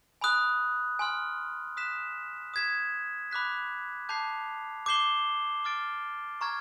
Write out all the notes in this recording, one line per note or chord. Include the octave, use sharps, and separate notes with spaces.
G#5 B5 D#6 F#6
G#5 C6 F6
D#6 F#6 B6 E7
D#6 G#6 B6 E7
B5 D6 F#6 B6
A5 D6 G6 C7 F7
D6 G6 C7 E7 G7
D6 F6 A6 D7
A#5 C#6 F6 G#6